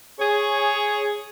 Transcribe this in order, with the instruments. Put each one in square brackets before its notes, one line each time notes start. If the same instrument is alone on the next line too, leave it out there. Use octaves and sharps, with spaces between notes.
[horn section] G#4 C#5